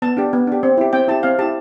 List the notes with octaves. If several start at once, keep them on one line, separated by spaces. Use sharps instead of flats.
B3 A5
D4 G4
B3
D4 G4
C4
E4 G4
C4 G5
E4 G4 A5
C4 F5
E4 G4 A5